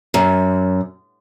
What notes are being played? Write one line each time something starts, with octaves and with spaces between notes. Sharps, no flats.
F#2